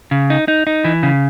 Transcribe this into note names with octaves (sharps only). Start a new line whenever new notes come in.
C#3
D#4
D#4
D#4
E3
C#3